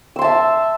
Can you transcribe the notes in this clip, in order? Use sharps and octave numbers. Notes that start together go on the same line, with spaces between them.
E5 A5 C6 E6